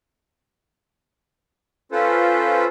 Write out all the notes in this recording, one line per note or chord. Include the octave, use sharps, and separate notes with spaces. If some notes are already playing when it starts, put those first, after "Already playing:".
C#4 F4 A4 B4 C5